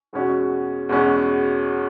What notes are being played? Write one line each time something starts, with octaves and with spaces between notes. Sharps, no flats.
E2 B2 G#3 C#4 F#4
E2 B2 G#3 C#4 F#4